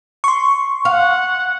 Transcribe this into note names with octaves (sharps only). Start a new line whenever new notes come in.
C6 C#6
F5 F#5